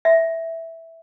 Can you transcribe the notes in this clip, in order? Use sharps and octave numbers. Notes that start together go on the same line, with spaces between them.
E5